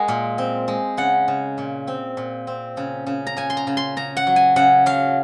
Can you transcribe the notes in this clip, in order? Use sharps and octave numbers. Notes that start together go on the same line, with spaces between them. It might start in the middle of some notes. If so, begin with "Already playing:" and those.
Already playing: G#3 A#4 F#5 G#5
A#2
C4
G#3
C#3 F#5
C#3
A#2
C4
A#2
C4
C#3
C#3
A#5
C#3 G#5
C6
A#5
C#3
C6
C#3 A#5
F#5
F#3
G#5
C#3 F#5
F#3 F5